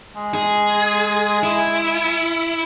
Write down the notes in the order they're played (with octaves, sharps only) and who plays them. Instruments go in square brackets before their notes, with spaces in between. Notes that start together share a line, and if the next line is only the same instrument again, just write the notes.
[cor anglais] G#3
[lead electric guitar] G#4
E4